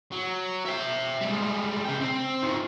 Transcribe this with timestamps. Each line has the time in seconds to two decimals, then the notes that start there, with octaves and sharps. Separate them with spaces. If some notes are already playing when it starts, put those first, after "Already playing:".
0.12 F#3
0.66 E5 G5
1.21 G3 G#3
1.85 C#3 G5
2.01 C4
2.43 D#3 F3